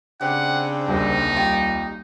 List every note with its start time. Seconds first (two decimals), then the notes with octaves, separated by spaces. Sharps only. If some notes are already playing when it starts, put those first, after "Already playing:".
0.21 C#3 C4 D4 G4 F#5
0.88 D#1 C2 A#3 D#4
1.36 F4 G4